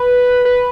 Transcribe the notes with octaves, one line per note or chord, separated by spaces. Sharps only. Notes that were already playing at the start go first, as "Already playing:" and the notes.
Already playing: B4
B4